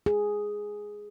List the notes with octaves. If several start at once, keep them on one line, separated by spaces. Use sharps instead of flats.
G#4